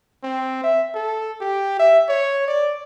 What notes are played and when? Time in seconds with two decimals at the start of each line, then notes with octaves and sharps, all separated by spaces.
0.23 C4
0.64 E5
0.95 A4
1.41 G4
1.80 E5
2.09 C#5
2.48 D5